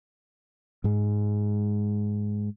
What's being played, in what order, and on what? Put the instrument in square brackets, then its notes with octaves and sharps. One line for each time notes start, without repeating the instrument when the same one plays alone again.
[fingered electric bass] G#2 G#3